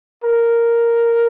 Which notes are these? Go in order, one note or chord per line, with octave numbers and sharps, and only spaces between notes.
A#4